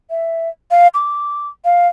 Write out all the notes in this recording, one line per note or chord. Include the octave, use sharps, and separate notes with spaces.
E5
F5
D6
F5